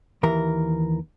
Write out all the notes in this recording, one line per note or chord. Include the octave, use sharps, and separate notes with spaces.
D#2 E3 A#4